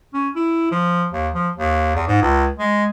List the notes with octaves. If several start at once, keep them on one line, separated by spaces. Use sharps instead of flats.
C#4
E4
F3
D#2
F3
D#2
E2
G#2
C#2
G#3